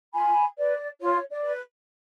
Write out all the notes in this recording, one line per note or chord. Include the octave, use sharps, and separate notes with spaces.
F4 G#5 B5
B4 D5
F4 C#5
D5
B4